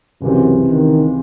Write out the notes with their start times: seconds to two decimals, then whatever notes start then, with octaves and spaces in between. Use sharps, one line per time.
0.21 C#2 F#2 C3 E3 C4
0.68 D#3